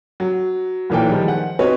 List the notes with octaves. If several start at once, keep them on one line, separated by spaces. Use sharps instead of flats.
F#3
B1 A#2 E3 A4 A#4 G5
D#3 F3 G3 G#3
F#5
C4 D#4 F#4 B4 C#5